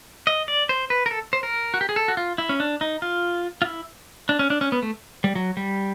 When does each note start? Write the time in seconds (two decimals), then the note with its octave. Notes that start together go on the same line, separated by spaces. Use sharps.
0.27 D#5
0.48 D5
0.69 C5
0.90 B4
1.06 A#4
1.11 A4
1.33 C5
1.43 A#4
1.74 F#4
1.81 G4
1.89 G#4
1.96 A4
2.08 F#4
2.17 F4
2.38 E4
2.49 C#4
2.60 D4
2.81 D#4
3.02 F4
3.62 F4
3.65 E4
4.29 D4
4.39 C#4
4.50 D4
4.61 C#4
4.72 B3
4.83 A3
5.24 G3
5.35 F#3
5.57 G3